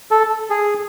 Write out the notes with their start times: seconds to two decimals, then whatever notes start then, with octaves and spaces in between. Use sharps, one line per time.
0.11 A4
0.50 G#4